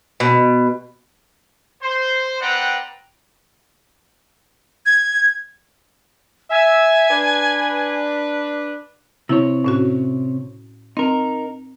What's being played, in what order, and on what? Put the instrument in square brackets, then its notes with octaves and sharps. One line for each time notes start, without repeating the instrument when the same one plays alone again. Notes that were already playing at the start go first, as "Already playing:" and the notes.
[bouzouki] B2
[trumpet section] C5 C6
C4 B4 D5 F#5 G5 A#5
[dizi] G#6
[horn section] E5 [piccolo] G#5
[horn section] D4 B4
[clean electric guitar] C3 C4 C#5 [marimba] E4
[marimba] A2 C#4 F#4
[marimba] C4 [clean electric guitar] D#4 A#4